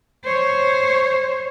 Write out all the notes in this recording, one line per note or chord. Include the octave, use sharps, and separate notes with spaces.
C5 C#5